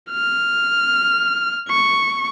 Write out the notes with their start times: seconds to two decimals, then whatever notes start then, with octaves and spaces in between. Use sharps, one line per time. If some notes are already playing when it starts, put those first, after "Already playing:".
0.11 F6
1.69 C#6